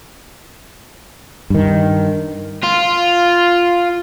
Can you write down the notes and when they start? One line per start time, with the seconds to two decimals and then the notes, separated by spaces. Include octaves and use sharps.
1.50 G2 D#3
2.63 F4